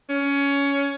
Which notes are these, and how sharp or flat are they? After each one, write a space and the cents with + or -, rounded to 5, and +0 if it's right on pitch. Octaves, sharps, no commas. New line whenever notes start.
C#4 +15